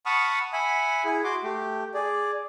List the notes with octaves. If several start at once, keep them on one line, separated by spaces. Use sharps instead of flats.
F#5 A5 B5 C#6 D#6 F6
E5 F#5 G#5 B5
E4 G#4
F#4 C6 D6
A3 G4
G#4 D5